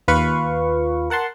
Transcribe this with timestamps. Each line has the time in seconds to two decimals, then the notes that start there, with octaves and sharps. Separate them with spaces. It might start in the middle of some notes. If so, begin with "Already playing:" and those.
0.08 D#2 F4 B4 F5 C#6
1.10 A#4 F#5 A5 C6